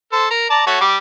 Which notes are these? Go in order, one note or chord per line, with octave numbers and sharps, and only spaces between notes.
A4 C5
A#4
D5 A5 A#5
A3 F#4 C#5
G3 D6